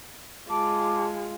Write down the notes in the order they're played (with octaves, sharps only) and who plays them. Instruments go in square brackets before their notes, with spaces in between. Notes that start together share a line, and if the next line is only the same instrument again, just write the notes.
[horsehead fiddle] G#3 [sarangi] F4 [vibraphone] A5 [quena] D6